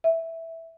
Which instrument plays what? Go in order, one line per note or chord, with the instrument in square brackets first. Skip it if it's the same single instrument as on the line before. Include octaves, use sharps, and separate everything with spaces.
[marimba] E5